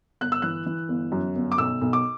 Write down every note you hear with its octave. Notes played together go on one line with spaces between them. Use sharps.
G1 F#6
E6
E3 F#6
E3
G1
F#2
G1
D6
B1 E6
B1
D6